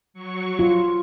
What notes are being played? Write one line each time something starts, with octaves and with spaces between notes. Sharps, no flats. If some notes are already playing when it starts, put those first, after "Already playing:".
F#3 C#6
F4